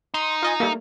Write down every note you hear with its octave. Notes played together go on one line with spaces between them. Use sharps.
D#4 C6
F4 D#5 G#5
G3 A3 A#3